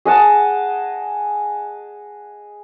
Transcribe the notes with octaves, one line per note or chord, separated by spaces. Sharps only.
G#4 D#5 F#5 A5